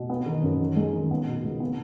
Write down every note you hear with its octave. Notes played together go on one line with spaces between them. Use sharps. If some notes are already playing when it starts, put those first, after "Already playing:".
Already playing: B2
B3
D#3
F#2
D#3
G#3
D#3
B3
B2
C#2
B3